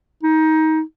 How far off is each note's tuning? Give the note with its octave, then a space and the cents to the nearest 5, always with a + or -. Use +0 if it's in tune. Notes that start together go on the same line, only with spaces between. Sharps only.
D#4 +20